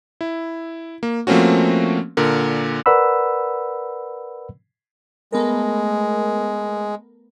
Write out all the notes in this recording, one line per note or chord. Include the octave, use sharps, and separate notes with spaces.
E4
A#3
F3 A3 A#3 C4 C#4 F#4
A#2 D3 A#4
A#4 B4 D5 F#5 B5 E6
G#3 A3 B3 A#4